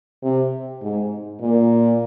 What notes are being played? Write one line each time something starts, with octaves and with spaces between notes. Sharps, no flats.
C3
G#2
A#2